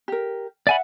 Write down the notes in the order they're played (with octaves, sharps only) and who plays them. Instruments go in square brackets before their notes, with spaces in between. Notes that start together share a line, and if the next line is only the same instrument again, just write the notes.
[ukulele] G4 A#4
[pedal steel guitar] D5 G#5 B5 [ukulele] E5 F#5